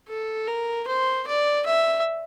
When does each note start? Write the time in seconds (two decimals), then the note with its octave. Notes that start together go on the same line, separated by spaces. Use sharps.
0.08 A4
0.47 A#4
0.87 C5
1.27 D5
1.66 E5